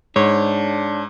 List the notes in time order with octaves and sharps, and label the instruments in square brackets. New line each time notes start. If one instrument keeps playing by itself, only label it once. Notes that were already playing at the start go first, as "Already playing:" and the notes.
[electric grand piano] G#2 [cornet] D4 [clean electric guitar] C#5